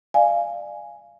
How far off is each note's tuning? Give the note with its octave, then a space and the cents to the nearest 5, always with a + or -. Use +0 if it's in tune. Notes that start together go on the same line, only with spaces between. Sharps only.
D5 +30 F5 -15 G#5 +0